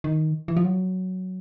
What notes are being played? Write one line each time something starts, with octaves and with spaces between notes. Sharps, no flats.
D#3
E3
F3
F#3